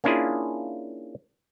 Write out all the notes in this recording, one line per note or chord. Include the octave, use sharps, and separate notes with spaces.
A#3 C#4 D4 E4 F4 G#4